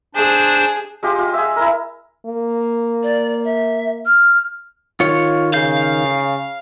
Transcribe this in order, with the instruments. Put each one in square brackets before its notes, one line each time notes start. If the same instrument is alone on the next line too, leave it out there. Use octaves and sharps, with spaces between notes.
[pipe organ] D4 C5 [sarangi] G#4
[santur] G#3 F4 G4
F4
G#4 E5
E4 A#4
[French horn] A#3
[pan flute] D5
E5
F6
[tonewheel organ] D#3 [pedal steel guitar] F4 C#5
[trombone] C#3 [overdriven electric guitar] F5 [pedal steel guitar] G6